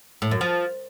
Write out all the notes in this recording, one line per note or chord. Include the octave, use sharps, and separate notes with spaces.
A2
F#2
F3